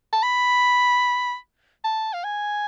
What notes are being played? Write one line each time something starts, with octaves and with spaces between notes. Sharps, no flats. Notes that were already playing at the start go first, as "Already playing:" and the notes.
A5
B5
A5
F5
G#5